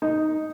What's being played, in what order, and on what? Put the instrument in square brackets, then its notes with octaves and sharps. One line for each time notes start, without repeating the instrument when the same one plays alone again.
[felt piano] D#4